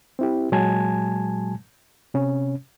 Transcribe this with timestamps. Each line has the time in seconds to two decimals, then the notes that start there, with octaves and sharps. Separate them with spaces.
0.19 C4 E4 G4
0.52 A#2 F#3 G#3 G#5 A5 G#6
2.14 C3 C#4